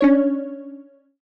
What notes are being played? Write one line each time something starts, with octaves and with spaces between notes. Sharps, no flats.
C#4 D4 C#5